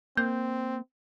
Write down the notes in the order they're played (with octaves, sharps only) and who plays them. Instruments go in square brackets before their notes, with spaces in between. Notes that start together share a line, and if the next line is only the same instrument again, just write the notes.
[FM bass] A#3 [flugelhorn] C4 [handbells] G6